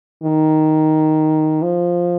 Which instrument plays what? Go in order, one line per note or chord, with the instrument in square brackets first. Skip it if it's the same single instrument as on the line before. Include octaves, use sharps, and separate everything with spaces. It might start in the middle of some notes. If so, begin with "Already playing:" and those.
[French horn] D#3
F3